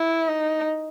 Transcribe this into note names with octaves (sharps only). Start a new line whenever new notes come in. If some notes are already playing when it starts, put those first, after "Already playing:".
Already playing: E4
D#4